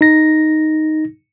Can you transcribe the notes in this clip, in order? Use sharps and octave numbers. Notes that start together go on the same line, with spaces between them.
D#4 A#6